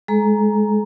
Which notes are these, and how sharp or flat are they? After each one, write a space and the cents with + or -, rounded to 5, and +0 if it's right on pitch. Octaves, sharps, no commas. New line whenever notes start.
G#3 +0 A4 -45 A#5 +0